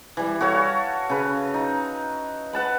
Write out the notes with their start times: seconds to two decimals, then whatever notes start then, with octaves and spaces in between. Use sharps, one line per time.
0.17 E3 G3
0.41 F#4 A4 C#5 F5
1.09 C#3 B4
1.54 D#4
2.53 B4 F#5 A5 B5